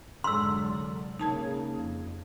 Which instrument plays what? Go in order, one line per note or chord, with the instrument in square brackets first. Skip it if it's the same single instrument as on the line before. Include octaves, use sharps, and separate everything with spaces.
[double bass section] F1 D3 F#3 [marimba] G#2 G#3 [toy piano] C6 E6
[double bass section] C#3 A#3 [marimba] D#4 A5 G#6
[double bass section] F2